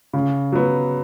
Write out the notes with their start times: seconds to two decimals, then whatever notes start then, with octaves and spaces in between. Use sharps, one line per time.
0.13 C#3
0.52 F#3 B3